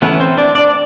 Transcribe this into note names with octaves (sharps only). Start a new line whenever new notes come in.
E3 A3 B3 C#4 B4
C4 C5
D4 D5
D4 D5